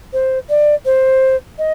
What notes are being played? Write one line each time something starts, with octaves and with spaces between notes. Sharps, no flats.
C5
D5
C5
D#5